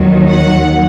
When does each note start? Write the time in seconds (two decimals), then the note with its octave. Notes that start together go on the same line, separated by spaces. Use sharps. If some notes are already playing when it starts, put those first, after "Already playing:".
Already playing: D#2 D#3 F#3
0.29 F#5